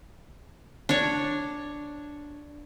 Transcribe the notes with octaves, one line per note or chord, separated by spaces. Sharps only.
D4 C#5